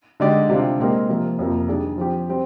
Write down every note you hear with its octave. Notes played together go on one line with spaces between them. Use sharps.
D3 G#3 D#4 G4 D5
C3 G3 D4 F4
A#2 G#3 C4 G4 A#4
C3 F3 A#3
F2 C3 F3 A#3
D#3 G3 D4 G#4 D5
F3 C4 G4
G3 C4